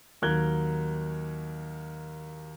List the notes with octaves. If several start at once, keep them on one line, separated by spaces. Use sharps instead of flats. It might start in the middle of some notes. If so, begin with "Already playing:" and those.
D#2 F#3 A#4 F#6 G#6 G7